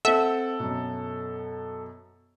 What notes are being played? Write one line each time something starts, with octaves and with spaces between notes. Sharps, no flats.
C4 A4 E5 F#5
F#2 B2